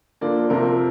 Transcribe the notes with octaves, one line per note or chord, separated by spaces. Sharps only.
D3 F3 A#3 D4 D5
F2 C3 F3 A3 C4 A#4